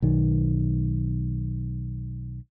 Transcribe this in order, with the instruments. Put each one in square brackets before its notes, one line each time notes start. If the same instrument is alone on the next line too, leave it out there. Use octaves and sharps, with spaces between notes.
[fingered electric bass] B1 D#3